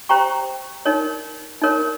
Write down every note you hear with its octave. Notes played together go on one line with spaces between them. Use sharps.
G4 C5 G5 A#5 C#6
D#4 A#4 C#5
D#4 A#4 C#5